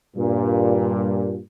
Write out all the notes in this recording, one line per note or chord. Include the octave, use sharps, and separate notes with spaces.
G2 A#2